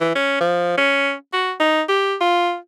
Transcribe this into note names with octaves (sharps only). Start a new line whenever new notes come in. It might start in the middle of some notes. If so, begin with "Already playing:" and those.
E3
C#4
F3
C#4
F#4
D#4
G4
F4